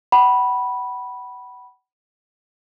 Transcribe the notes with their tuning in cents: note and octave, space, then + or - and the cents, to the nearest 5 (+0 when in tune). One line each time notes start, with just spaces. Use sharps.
F#5 +35 B5 -10